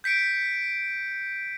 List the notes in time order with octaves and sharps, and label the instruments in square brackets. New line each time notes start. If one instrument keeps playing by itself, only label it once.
[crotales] G6 B6 C#7 D7